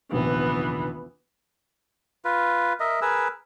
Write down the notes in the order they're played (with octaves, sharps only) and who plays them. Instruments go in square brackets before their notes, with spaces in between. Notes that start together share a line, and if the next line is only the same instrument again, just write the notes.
[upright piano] F1 A#1 D#2 [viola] E3 B3
[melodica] F4 B4
A#4 D#5 E5
G#4 A#4 B4 E6